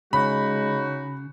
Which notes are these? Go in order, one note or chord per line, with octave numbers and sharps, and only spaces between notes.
C#3 G#3 C#4 D#4 F#4 B5